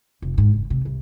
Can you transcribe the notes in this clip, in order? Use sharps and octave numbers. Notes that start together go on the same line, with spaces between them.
F1
G#2
F#1
C3
C2